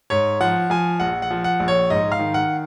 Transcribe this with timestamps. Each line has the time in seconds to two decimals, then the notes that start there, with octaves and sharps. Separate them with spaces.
0.10 G#2 C#5
0.40 F3 F#5
0.70 F3 G#5
1.00 A#1 F#5
1.22 F#5
1.31 F3
1.44 F#5
1.60 A#1
1.68 C#5
1.90 G#2 D#5
2.12 F5
2.19 D#3
2.34 F#5